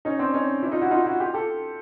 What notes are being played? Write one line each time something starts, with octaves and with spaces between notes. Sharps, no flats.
C#4 D#4
C4 D4
C#4 D#4
D4 E4
D#4 F4
E4 F#4
D#4 F4
E4 F#4
F4 G4
G4 A4